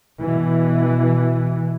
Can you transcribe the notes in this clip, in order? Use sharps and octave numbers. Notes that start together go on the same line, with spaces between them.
B2 E3